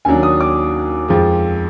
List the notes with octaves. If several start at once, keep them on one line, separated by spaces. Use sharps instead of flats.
D#2 D#3 F#3 D4 G#5
D#6
D6
F2 F3 G#3